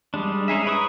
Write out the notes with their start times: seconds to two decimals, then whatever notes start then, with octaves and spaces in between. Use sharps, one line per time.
0.14 G3 G#3 D4
0.48 C#4 D#4 G#4 E5
0.66 E4 B4 C#5 D#6